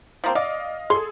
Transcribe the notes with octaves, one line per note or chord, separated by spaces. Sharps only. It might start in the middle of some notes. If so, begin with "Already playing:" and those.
F3 A#3 C4
D5 D#5 F5
G#4 A4 C6